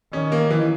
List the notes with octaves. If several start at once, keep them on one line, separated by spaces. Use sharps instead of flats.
D#3 C#4
A#3
E3